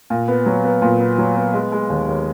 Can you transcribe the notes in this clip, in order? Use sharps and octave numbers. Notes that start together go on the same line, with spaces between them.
A#2
B3
F#3
B3
A#2
B3
F#3
B3
G#3
G#3
D#2
D#2